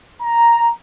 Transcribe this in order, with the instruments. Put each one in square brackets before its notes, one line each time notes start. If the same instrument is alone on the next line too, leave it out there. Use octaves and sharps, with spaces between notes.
[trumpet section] A#5